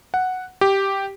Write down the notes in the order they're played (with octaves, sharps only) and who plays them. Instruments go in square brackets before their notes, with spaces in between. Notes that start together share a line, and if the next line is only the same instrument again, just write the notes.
[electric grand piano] F#5
G4